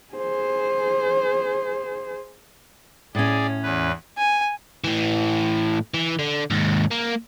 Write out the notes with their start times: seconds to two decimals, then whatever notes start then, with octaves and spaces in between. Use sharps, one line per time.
0.14 G#4 C5
3.15 A2 C#4 G#4 D5
3.63 E2 B4
4.18 G#5
4.84 A2 E3
5.94 E3
6.19 D3
6.51 D#2 G#2
6.91 A#3